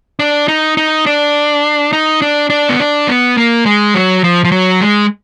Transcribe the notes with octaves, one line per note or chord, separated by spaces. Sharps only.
D4
D#4
D#4
D4
D#4
D4
D4
B3
D4
B3
A#3
G#3
F#3
F3
F3
F#3
G#3